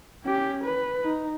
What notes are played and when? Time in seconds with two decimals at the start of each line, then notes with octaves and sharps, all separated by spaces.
0.24 C#4 G4
0.64 B4
1.04 D#4